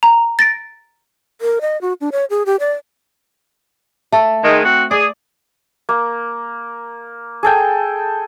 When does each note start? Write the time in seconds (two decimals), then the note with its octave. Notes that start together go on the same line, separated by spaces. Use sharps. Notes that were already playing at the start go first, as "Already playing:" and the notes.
0.03 A#5
0.39 A6 A#6 D7
1.41 A#4
1.61 D#5
1.81 F#4
2.01 D4
2.12 C#5
2.30 G#4
2.46 G4
2.60 D5
4.12 A3 A4
4.44 D#3 G#3
4.64 C4 F#4
4.91 G#4 D5
5.89 A#3
7.43 G#4 A4 G5